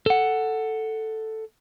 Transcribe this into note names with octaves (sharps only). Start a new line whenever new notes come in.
A4 F#5